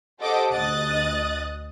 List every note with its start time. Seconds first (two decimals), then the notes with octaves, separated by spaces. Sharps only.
0.20 G4 A4 C5 D#5 F#5 D6
0.51 D2 D#5 D#6 F#6 A6